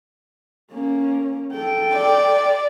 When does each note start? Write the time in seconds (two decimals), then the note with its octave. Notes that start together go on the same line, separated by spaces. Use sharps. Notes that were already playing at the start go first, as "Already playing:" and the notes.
0.73 A#3 C#4
1.53 A4 G5
1.95 D5